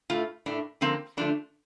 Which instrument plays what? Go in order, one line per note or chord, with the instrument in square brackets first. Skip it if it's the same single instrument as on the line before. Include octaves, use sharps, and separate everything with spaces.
[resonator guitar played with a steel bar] A2 A3 F4
A2 A3 D4
D3 F3 A#3 C4
D3 F3 A3 D4